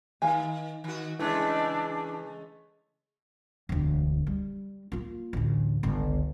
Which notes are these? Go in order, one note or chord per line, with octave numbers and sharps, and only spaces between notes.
D#3 F5 G#5
D#3 F#4
C#3 E3 G#3 A3 D4
E1 D2
G3
A#3 F4
A1 D2
G1 C#2